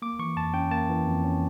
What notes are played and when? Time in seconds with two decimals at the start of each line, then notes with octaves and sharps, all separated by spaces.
0.02 A#3 D6
0.19 E3 C#6
0.37 F2 A5
0.54 C#4 G5
0.71 A#3 A5
0.89 E3
1.06 F2
1.24 C#4